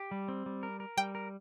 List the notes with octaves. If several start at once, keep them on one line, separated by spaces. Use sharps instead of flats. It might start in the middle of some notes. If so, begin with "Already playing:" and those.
Already playing: G4
G3
C4
G3
A#4
A#4
G3 G5
A#4